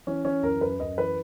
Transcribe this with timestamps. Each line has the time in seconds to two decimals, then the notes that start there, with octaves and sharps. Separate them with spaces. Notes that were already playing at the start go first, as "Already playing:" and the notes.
0.07 E3 C#4
0.25 E3 C#4
0.43 F#2 A#4
0.61 F#2 B4
0.79 F#2 D#5
0.97 E3 B4